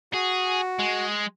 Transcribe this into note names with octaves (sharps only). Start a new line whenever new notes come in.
F#4 G#4
G#3